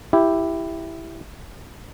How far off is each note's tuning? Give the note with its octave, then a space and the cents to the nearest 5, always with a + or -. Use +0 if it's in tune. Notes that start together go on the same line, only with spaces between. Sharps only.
E4 +0 G4 +0